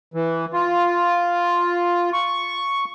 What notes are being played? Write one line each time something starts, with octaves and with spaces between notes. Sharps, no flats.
E3
F4
C#6